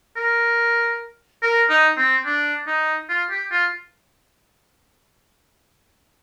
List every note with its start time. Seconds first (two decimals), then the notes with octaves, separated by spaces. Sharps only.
0.16 A#4
1.42 A#4
1.69 D#4
1.97 C4
2.26 D4
2.67 D#4
3.09 F4
3.30 G4
3.51 F4